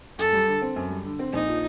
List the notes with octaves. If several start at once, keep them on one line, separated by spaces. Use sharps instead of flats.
F#2 A4
G3
D3
C4
F#2
G3
D3
C4
A#1 D#4
F3